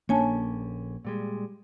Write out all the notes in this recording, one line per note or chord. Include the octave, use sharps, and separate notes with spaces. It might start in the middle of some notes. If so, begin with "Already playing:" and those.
A#1 D3 A#3 C#4 D4 C#5 G#5 A5
A#2 G3 G#3